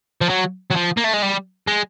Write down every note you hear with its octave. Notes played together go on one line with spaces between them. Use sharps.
F3
F#3
F#3
F3
A#3
A3
G#3
G3
G#3